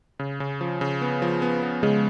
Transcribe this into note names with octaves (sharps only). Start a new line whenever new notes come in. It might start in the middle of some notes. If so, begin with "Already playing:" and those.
C#3
C#3
F3
C#3
B3
F3
B3
B3
C#3 G#3